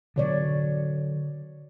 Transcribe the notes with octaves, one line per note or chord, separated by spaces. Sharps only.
B2 D3 F#3 C#5 D5